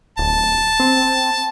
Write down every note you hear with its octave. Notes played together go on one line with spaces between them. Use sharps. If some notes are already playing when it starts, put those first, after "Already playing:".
D1 A5
C4